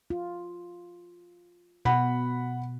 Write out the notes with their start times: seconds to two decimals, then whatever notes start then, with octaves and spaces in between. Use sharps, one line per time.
0.10 F4
1.85 B2 F#5 B5